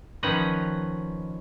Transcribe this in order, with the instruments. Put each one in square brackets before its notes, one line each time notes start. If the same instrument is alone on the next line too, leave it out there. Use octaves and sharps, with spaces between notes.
[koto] D#3 F3 C#4 D#4 B4 A#5